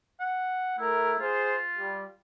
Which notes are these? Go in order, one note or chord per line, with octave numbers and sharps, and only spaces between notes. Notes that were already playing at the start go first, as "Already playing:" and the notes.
F#5
A3 E4 A#4
F4 G#4 C5
G3